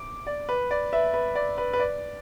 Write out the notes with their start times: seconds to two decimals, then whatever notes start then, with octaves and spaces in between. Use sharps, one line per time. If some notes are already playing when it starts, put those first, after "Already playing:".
Already playing: D6
0.27 D5
0.49 B4
0.71 D5
0.93 B4 E5
1.14 B4
1.35 D5
1.58 B4
1.73 B4
1.80 D5